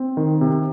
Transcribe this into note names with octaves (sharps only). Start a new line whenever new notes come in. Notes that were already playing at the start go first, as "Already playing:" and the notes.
Already playing: C4
D#3
C3